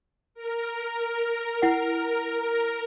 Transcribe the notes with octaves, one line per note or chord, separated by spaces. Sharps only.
A#4
E4 F#5